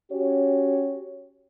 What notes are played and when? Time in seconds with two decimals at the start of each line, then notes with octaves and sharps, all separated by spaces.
0.12 C#4 F#4 G4 C#5